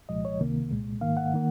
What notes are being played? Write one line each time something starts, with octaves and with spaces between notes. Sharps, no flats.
C2 A#2 F3 G#3 D#5
C#5
C#2 C3 D#3 A#3
C2 A#2 G#3
G#2 D#3 A#3 F5
F#5
D#3 A#3